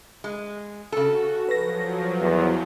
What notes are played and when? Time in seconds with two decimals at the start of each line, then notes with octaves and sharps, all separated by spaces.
0.24 G#3
0.92 C#3 F#4 A4
1.49 F3 F#3 B4 A#6
2.21 E2